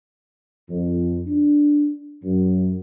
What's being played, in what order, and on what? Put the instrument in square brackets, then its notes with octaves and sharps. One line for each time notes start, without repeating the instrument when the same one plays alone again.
[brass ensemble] F2
D4
F#2